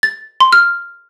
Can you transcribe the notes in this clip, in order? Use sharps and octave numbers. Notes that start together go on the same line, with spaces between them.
A6
C6
F6